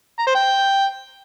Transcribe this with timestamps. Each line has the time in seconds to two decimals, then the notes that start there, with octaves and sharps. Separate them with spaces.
0.19 A#5
0.27 C5
0.35 G5